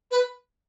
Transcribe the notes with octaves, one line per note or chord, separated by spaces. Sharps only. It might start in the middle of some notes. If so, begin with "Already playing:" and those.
B4